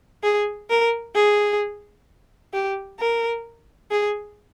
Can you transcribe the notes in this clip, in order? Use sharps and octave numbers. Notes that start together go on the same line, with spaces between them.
G#4
A#4
G#4
G4
A#4
G#4